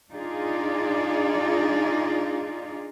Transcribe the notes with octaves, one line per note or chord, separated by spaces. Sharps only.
D4 D#4 F4 G#4 D5